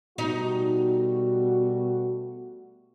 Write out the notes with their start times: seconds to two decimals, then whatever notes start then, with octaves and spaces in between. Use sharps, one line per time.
0.18 B2 G3 A3 D#4 F#4